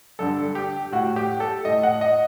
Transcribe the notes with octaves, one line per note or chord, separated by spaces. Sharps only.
G2 D3 A4
G4
A2 F#4
G4
A4
A2 D#5
F#5
D#5